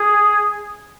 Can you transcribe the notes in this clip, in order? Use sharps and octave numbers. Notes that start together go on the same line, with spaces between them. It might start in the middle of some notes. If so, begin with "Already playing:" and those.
Already playing: G#4